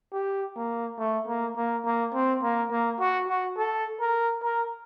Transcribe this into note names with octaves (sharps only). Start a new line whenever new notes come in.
G4
A#3
A3
A#3
A#3
A#3
C4
A#3
A#3
F#4
F#4
A4
A#4
A#4